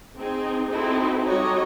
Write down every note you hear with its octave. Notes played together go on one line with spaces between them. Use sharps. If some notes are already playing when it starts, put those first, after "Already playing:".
C4 D#4 G#4
C4 D#4 E4 F#4 A4
G3 F#4 A4 C#5 D#5 A#5